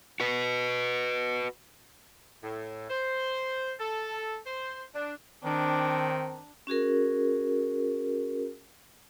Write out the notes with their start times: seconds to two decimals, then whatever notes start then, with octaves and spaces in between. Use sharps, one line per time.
0.20 F#4 B4
2.44 A2
2.90 C5
3.80 A4
4.46 C5
4.95 D4
5.44 D#3 C4 D4
6.67 C#4 F#4 G#4 A#4